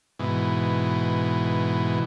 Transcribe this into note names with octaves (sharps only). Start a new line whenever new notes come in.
G#2 B2 E3